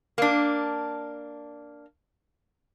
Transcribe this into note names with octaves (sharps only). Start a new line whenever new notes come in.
A#3 D4